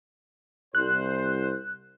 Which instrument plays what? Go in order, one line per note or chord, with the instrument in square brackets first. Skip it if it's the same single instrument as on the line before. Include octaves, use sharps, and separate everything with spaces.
[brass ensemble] C2 C5 [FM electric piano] F#6